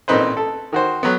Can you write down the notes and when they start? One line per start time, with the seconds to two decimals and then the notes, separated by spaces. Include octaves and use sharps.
0.08 A1 A#2 C4 D#4 B4 C5
0.37 A4
0.72 D#3 F#4 C5
1.03 F#3 B3